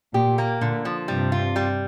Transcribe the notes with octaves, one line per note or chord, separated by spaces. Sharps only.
A#2 G4
A#3
A#2 D3
F3
G2 C3 G3
F4
G3